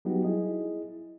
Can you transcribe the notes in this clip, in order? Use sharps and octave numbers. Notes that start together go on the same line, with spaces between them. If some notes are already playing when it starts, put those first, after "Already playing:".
F#3 G3 B3 D#4 F#4 G4
E4 G#4 D#5